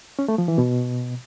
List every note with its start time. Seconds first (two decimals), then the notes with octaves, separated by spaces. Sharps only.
0.19 C#4
0.28 A3
0.38 F3
0.48 E3
0.58 B2